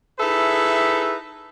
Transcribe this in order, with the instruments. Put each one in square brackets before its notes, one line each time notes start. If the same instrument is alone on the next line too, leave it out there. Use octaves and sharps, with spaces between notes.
[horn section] D#4 E4 G#4 A4 B4 E5